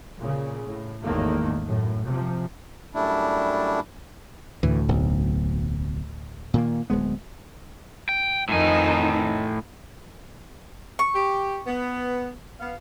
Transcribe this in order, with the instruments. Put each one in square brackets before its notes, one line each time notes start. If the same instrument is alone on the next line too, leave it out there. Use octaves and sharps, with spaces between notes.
[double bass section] A#2 C#3
A2
G#1 E2 A2 D#3 A3 A#3
F#2 A2
C3 F3
[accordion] F#2 G3 A3 D4 E4
[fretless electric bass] D2 A2 [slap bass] E3
[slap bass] D1 B1
A#2 D#3 A#3
D1 G#3 B3
[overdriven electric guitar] G5
[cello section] F2 D#3 D#4 [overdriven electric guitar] A2 G#5
[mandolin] C#6
[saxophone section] G4
B3
B3 F5